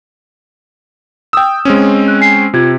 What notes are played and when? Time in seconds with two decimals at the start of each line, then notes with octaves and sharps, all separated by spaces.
1.33 G5 D#6 E6
1.65 G#3 C4 C#4
2.08 F#6
2.20 G#5 C7
2.54 C3 F4 G#6